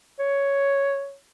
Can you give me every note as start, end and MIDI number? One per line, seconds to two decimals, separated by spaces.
0.19 1.15 73